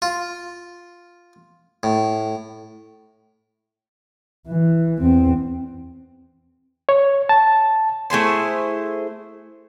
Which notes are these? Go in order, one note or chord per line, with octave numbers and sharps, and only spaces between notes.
F4
A2
E3
E2 C4
C#5
A5
A3 E4 G#4 C5